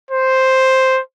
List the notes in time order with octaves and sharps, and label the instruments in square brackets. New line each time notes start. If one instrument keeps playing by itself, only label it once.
[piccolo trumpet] C5